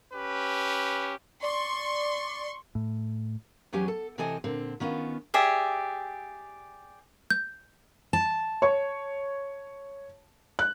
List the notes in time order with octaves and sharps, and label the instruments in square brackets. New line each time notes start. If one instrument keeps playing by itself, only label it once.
[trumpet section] C#4 G4 B4
[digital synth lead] D5 [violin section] C6 C#6
[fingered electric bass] A2
[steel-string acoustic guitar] E2 F#3 C#4 G4 G#5
A4
C3 E3 C4 A4 D#5 G#5
A#2 D3 C4
D#3 B3 C#4 F4
[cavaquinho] G4 G#4 D5 E5
[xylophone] G6
[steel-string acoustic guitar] A5
[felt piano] C#5 C#6
F#6